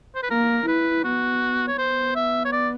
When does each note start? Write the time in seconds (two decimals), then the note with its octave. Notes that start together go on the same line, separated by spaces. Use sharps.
0.15 C5
0.23 B4
0.30 A#3 A#4
0.67 E4 B4
1.04 B3 F#4
1.68 C#5
1.78 B3 C5
2.15 E5
2.45 C#5
2.52 D5